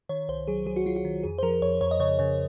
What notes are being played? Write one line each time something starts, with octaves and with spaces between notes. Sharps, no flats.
D#3 C#5
C2 C5
F#3 G#4
F#3 G#4
F#4
F#3 F4
F#4
D#3
F2 G#4
C5
F3 A#4
F2 C#5
F2 C#5
D#5
C#3 C#5
C#3 C#5